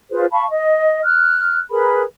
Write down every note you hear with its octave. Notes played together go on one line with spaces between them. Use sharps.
F4 G#4 B4 C5
F5 A5 B5 C#6
D#5
F6 F#6
G#4 A#4 B4 B5